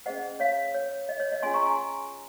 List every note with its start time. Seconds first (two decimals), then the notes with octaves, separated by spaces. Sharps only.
0.06 C#4 G#4 C5 D#5 F#5
0.40 C#5 F5
0.74 C#5
1.09 D#5
1.20 C#5
1.32 D#5
1.43 C#4 F4 G#4 C#5 G#5 C6
1.54 A#5 C#6
1.66 G#5 C6